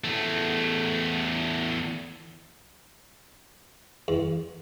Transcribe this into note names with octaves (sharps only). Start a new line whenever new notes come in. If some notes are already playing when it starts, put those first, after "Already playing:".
E2 A3
E2